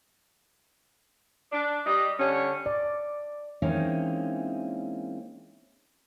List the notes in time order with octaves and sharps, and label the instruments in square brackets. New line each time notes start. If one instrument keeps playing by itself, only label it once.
[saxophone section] D4
G3 D#5
D3 G3 C#4 C#5
[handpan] D5
[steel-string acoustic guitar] E3 G#3 A#3 C4 C#4 D#4